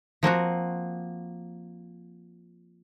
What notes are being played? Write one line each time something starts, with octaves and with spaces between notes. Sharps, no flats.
F3 A#3 C4 F#4